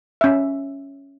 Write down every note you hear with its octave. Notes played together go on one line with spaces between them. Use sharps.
C#4 E5